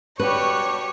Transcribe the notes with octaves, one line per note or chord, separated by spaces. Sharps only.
G3 D4 F#4 G4 B4 C#5 C#6